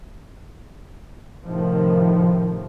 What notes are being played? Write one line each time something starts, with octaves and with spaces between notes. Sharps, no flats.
A2 C3 D#3 F3 A3